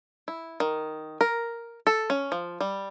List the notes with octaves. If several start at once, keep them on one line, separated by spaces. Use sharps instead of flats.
E4
D#3
A#4
A4
C#4
F3
G3